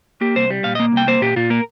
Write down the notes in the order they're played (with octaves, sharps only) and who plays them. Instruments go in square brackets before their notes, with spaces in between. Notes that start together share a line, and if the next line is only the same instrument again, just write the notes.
[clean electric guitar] A#3 G4
C2 C5
G3
A#2 F5
A#3 D#5
C2 G5
A#3 C5
A#2 G4
A#2 F4
A#3 A#4